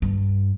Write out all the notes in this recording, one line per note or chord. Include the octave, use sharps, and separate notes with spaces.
G2